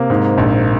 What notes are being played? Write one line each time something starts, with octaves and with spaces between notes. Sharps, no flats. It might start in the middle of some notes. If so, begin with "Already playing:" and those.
Already playing: C3 A#3
G#2
A#1